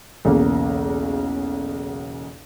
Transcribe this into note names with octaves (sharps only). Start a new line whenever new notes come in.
B1 E2 C#3 A#3